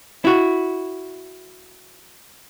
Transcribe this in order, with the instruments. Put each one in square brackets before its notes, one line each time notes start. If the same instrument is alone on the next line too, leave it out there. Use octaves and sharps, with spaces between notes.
[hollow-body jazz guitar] E4 F#4